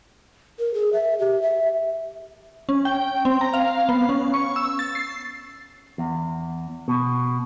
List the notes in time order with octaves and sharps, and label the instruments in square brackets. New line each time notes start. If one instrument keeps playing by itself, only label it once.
[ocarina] A#4
G#4
E5
G4
E5
[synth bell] C#4
G5
C4
A#5
F5
B3
C#4
C#6
E6
A6
C7
[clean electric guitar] E2
B2